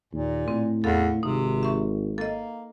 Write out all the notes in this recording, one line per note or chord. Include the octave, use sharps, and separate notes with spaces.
D#2 A#2
A2 C4
E2 A4 F5
G#1 C3 D#4
E5 C#6
A#3 A4 D#5